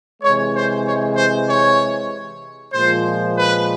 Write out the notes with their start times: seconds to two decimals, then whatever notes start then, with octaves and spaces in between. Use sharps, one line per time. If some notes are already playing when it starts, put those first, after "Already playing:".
0.22 C3 E3 G#3 C#5
0.54 C5
0.85 C#5
1.16 C5
1.48 C#5
2.73 A#2 F3 G#3 C5
3.36 B4